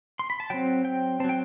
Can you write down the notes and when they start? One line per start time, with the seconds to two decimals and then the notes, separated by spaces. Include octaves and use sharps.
0.19 C6
0.30 B5
0.40 A5
0.50 F#3 C4 G5
0.85 G5
1.20 C4 A5
1.24 F#3 G5